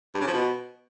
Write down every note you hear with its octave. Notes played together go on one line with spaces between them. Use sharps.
G2
C#3
F3
B2